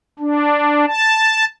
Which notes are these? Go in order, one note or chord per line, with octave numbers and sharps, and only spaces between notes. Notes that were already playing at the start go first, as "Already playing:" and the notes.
D4
A5